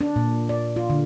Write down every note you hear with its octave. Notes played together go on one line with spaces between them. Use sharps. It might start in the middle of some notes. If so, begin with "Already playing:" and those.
D4
A#2
D5
F4
D3